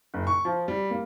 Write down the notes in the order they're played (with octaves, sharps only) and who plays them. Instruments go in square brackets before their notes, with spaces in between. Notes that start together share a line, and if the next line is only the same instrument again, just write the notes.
[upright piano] F#1
C#6
F3
G3
A#3